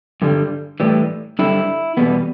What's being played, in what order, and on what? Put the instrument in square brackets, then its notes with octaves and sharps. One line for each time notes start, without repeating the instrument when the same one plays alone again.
[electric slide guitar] G2 D3 G3
A2 E3 G3
G2 D3 G3 E4
E2 B2 G3 B3